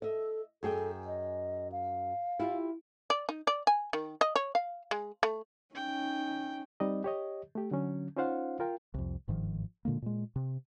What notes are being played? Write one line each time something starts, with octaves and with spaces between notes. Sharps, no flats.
A4 D#5 E5
F#2 G#4 A4 G5
D#5
F5
E4 F4 G4
D5
D#4
D5
G#5
D#3
D#5
C#5
F5
G#3
A3
C#4 D#4 G5
G3 C4 D#4 D5 D#5
G4 C#5 D#5
A3 G4
D3 F#3 C#4
C#4 D#4 F4 C5 F5 F#5
F4 A#4 G5
C2 F2
G1 G#2 D#3 F3
A#2 D3 G#3 A#3
A#2 G#3
C3